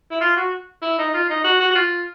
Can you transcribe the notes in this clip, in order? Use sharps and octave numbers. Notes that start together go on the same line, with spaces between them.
E4
F4
F#4
E4
D#4
F4
D#4
F#4
F#4
F#4
F4